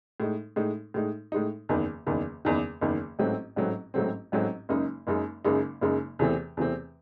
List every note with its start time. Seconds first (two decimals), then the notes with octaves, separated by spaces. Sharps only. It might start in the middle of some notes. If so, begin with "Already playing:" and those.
0.20 A2 G#3 D#4
0.56 A2 G#3 D#4
0.94 A2 G#3 D#4
1.32 A2 G#3 D#4
1.69 F#1 E2 D#3
2.07 F#1 E2 D#3
2.45 F#1 E2 D#3
2.81 F#1 E2 D#3
3.19 A1 G#2 F#3 A3 C4
3.56 A1 G#2 F#3 A3 C4
3.94 A1 G#2 F#3 A3 C4
4.32 A1 G#2 F#3 A3 C4
4.69 F#1 F#2 C#3 G#3 D#4
5.07 F#1 F#2 C#3 G#3 D#4
5.44 F#1 F#2 C#3 G#3 D#4
5.81 F#1 F#2 C#3 G#3 D#4
6.19 E2 C3 E3 A3 C4
6.57 E2 C3 E3 A3 C4